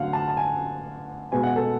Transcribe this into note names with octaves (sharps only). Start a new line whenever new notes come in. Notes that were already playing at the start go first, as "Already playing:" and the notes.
Already playing: D3 F#3 A3 F5 F#5
A5
A5
G#5
B2 G#3 B3 G#5
F#5
A4